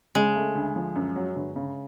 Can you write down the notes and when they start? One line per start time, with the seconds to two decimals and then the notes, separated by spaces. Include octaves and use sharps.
0.15 C#3 G#3
0.36 A3
0.55 D2
0.76 F3
0.96 F#2
1.16 F#3
1.36 G1
1.56 C#3